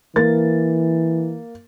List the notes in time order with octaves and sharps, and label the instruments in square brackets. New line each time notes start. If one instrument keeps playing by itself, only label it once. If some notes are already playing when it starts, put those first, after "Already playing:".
[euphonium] E3 [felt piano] A#3 A6